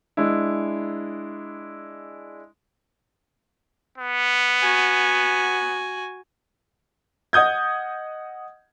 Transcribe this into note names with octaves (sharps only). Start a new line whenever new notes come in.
G#3 D4 E4
B3
F#4 G#5
D#5 F#5 D#6 G6 G#6